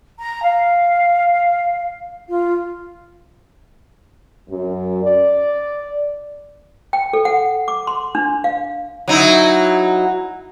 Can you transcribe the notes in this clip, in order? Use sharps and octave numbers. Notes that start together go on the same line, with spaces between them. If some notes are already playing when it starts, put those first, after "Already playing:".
A#5
F5
F4
F#2
D5
G5
A4
F#5
D6
C6
D4
F5
F#3 D#4 E4